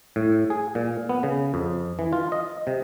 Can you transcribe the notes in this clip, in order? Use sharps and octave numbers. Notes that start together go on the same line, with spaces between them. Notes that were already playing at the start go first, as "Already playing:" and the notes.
A2
G#4
A#2
B3
C#3
F2
E3
F4
D#5
C3